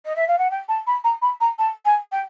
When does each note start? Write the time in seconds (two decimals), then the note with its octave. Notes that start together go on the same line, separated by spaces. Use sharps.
0.05 D#5
0.15 E5
0.27 F5
0.38 F#5
0.51 G5
0.68 A5
0.87 B5
1.04 A#5
1.22 B5
1.40 A#5
1.58 A5
1.85 G#5
2.12 G5